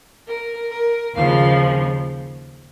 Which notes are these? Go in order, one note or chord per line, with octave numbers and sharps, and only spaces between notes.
A#4
A#4
D#2 C#3 F3 F5